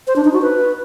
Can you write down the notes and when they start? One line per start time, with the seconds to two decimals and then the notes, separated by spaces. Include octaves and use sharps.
0.07 C5
0.16 D4
0.25 D#4
0.33 F#4
0.42 B4